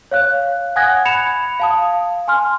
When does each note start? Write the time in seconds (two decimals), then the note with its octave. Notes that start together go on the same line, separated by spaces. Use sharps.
0.11 C#5 F5 F#6
0.76 F#5 G#5 D#6 F#6 G#6 A#6
1.05 B5 G#6 C#7 E7 F7
1.60 F5 A5 D#6
2.28 G#5 C6 F6